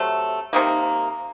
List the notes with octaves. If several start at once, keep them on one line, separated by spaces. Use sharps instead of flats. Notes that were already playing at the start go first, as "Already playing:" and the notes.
Already playing: C3 F#3 A3
C3 D#3 A#3